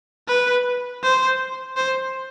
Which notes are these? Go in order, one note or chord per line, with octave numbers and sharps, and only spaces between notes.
B4
C5
C5